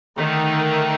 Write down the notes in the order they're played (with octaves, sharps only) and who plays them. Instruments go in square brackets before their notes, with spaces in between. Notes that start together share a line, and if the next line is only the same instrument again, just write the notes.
[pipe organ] D3 A3 D#4 [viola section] D#3